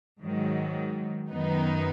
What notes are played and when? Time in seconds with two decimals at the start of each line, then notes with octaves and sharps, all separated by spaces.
0.20 G#2 D#3 F#3
1.31 F#2 D#3 B3 D#4